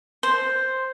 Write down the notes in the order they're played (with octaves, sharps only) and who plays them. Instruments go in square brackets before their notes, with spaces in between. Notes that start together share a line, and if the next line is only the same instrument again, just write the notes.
[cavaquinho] C5